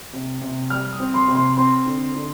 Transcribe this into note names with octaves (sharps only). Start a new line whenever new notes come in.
C3
C3
G3 F6
D#6
C4
C6
C3
C6
C4 C6
D3
D3